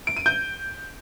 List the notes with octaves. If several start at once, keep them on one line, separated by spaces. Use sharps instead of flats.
D7
D#7
G6